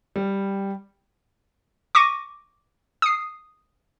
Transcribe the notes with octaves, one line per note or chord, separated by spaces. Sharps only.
G3
C#6 D6 A#6 D#7
D#6 C7